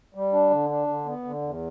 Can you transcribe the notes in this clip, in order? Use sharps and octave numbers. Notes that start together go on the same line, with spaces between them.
G3
D4
D3
D4
D3
B3
D3
E2